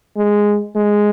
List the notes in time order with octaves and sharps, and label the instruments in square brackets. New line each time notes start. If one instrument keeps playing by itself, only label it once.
[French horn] G#3
G#3